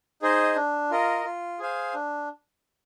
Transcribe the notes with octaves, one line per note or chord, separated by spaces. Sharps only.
D#4 G#4 C5 D#5
D4
F4 A#4 D#5
F4
G#4 C5 F5 G#5
D4